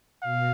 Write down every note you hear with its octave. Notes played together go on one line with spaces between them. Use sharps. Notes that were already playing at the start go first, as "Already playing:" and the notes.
B2 F5